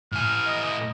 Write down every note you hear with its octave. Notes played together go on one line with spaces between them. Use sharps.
A2 G#5 F6
D#5